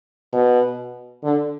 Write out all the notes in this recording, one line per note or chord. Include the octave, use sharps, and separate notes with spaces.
B2
D3